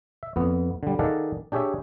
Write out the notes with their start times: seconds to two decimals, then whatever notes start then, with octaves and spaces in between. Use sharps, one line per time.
0.23 E5
0.36 F2 B3
0.83 D3 G3
0.99 D#3 G#4 A4 D5 F5 F#5
1.52 D4 G4 G#4 C#5 E5